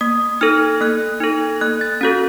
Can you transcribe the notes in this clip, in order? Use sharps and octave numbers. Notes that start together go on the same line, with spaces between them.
A#3 D#6
D#4 A4 F6
A#3 F#6
D#4 A4
A#3 F#6
A6
C#4 F#4 A4 A6